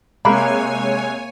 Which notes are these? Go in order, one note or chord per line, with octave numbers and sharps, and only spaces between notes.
C3 G#3 A#3 C#5 G#5 B5